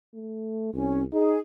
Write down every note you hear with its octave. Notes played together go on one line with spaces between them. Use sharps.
A3
C2 C#4
D#4 G#4